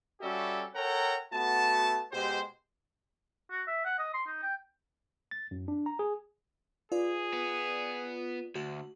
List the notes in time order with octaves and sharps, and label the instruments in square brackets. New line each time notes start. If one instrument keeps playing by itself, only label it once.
[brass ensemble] G3 C#4 F#4 G4 A4 E5
A4 A#4 C#5 F#5 G5 A#5
A3 B3 F#4 A5
B2 G#3 G4 C5
[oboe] F#4
E5
F#5
D#5
C6
D#4
G5
[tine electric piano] A6
F#2
D4
A#5
G#4
[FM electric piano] F4 B4 D5 [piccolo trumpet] G#4
[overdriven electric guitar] B3
[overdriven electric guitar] D2 [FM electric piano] F#4